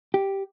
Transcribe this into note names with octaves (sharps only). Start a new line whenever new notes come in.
G4